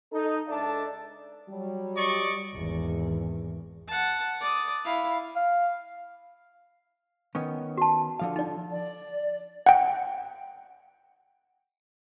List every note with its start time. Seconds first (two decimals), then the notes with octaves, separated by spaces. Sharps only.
0.12 D#4 A4
0.47 C#2 D4 A4 D5 E5 A5
1.49 F#3 G3
1.96 D5 D#5 C#6
2.55 G#1 E2
3.88 F#5 A5
4.41 D5 D#6
4.85 E4 F5
5.35 F5
7.35 D#3 B3 C#4
7.77 F#4 A5
8.20 D3 F3 F5
8.36 D#4 D5
8.70 D5
9.66 F#5 G5